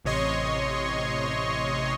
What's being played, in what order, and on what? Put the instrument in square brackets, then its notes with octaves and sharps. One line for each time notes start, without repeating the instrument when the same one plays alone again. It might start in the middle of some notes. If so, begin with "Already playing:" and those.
[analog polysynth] A1 C3 C#5 D#5 C6 C#6